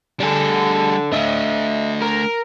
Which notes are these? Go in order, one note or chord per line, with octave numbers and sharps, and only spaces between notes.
G3 D4 G#4 A4
A3 D4 D#5 E5
A#4